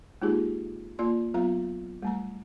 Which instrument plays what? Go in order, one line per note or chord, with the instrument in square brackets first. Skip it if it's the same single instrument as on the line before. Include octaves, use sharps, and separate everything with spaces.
[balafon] G#3 A#3 D#4 F4 G4 G#4
A#3 F4 D5 C6
F#3 B3 F4 F5 A#5
G3 A3 A#5